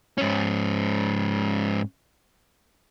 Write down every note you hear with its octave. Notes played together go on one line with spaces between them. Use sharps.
G#2 C#4